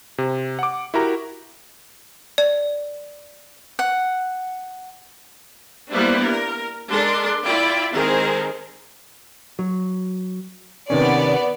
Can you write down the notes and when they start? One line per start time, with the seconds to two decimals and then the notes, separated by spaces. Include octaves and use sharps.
0.18 C3
0.59 F#5 D6
0.94 E4 F#4 G4 A#4 A#5
2.38 D5
3.79 F#5
5.90 G3 A#3 B3 D4 E4 C5
6.20 A#4
6.88 G#3 D4 A4 A#4 C6
7.43 E4 F4 D5 G5 B5
7.93 D#3 G#3 C4 G#4 A#4 C5
9.59 F#3
10.90 C3 D#3 B3 C#4 D5